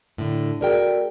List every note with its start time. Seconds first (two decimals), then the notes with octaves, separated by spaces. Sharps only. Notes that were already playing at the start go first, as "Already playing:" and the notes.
0.18 A2 D3
0.61 A3 F#4 G#4 A#4 D5 G5